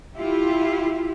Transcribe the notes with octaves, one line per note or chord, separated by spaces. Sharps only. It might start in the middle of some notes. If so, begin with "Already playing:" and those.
E4 F4 G4